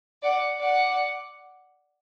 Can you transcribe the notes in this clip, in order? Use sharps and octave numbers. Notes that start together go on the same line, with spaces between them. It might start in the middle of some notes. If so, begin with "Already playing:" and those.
D5 F#5
D5 F#5